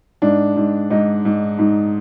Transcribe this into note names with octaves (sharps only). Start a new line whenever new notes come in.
G#2 D4
G#2
G#2 D#4
G#2
G#2